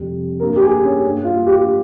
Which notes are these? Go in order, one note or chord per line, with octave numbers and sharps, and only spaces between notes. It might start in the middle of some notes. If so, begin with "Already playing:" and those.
Already playing: F2 C3 G3
G2 G3 A#3 A#4
G4
G#4
C#4
G2 G3 A#3
F4
G4